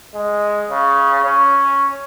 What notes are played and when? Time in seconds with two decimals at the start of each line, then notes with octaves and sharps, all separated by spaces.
0.15 G#3
0.71 C#3
1.24 C#4